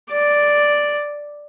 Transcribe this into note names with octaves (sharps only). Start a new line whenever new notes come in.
D5